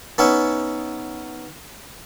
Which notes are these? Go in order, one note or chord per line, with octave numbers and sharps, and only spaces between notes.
B3 C#4 D#4 E4